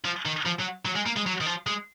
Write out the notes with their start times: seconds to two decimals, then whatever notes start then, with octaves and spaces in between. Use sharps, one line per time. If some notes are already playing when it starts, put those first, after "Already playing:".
0.05 F3
0.26 D#3
0.46 F3
0.60 F#3
0.85 F#3
0.95 G#3
1.06 A#3
1.16 G#3
1.26 F#3
1.41 D#3
1.46 F3
1.67 G#3